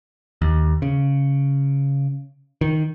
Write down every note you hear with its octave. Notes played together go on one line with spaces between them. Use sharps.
D#2
C#3
D#3